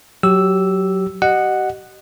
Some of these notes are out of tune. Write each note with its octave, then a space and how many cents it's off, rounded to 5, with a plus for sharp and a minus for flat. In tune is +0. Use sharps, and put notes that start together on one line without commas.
F#3 +0 G4 -20 E6 +0
G4 -40 D#5 -25 F#5 +0